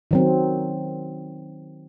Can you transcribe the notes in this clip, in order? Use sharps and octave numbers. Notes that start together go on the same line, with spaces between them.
D#3 F#3 C4